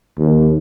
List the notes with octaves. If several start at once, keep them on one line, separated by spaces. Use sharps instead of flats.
D#2